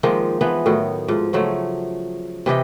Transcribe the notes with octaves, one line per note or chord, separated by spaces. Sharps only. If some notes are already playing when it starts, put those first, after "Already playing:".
D#3 F3 G#3 A#3
E3 F3 B3
A2 D#3 F#3
G#2 F3
C#3 F3 F#3 A3
C3 E3 G4 D#5